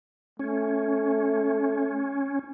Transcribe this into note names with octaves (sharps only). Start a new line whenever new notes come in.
A3 C#4